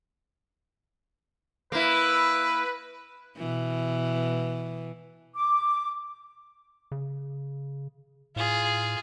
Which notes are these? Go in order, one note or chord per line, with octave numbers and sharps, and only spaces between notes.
A#3 E4 B4
B2 E3
D6
C#3
A2 F4 G#4